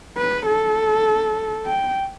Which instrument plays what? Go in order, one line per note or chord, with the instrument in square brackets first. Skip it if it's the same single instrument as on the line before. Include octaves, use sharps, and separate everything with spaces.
[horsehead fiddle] B4
A4
G5